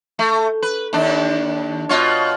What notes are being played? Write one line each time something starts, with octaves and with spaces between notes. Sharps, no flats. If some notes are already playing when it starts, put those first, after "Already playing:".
A3
B4
D#2 D4
B2 F4 C#5